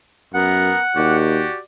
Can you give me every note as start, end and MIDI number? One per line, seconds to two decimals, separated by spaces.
0.34 0.72 42
0.34 0.79 59
0.34 0.79 70
0.34 1.16 78
0.96 1.45 39
0.96 1.58 66
0.96 1.58 67
0.96 1.58 74